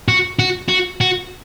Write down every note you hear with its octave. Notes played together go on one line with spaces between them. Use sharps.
F#4
F#4
F#4
F#4